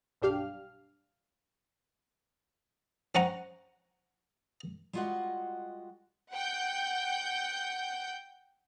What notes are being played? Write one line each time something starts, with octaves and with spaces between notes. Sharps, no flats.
B1 G2 D4 G4 F5 F6
C4 C#4 F#5 A#5
G3 G#3 F4 F#4 D#5 F#5
F#5 G5 G6